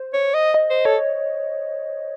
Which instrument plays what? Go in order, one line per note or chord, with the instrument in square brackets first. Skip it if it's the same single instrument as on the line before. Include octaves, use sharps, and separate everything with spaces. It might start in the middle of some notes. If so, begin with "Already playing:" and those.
Already playing: [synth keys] C5
[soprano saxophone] C#5
D#5
[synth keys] D#5
[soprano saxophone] C5
[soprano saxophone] A4 [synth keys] C#5